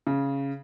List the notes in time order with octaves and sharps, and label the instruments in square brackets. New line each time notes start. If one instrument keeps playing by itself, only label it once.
[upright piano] C#3